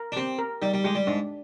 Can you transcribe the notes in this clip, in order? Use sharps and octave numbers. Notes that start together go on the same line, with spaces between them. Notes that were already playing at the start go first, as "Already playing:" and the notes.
Already playing: A#4
D4
C4 G4
A#4
G3 D#4
G3
G#3 G4
G3
G#2 D4